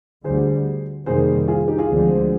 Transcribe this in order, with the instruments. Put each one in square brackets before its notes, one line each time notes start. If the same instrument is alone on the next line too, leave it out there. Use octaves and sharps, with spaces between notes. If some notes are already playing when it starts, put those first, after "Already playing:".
[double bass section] D2 D3 G3 [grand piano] G#4 C5
[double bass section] F2 C3 D#3 G3 A#3 [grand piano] G#4 C5
[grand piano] F4 G#4
D#4 G4
F4 G#4
[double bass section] D2 D3 F3 G#3 C4